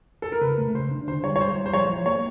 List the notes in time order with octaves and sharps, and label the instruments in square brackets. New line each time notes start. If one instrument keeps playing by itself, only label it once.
[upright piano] A4
A#4
[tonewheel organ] C#3 [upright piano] B4
[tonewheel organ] A3
[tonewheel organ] C#3 [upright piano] C5
[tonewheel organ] D4
[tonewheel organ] D3 [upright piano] C5
[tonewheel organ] G3 [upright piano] C#5
[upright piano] C#5
[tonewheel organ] G3 [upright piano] C5
[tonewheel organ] G3
[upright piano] C5
[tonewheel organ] F3 [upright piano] C#5
[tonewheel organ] F3
[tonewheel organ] A#3 [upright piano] C#5